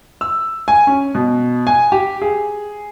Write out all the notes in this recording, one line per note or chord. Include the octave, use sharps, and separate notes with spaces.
E6
G#5
C#4
B2
G#5
G4
G#4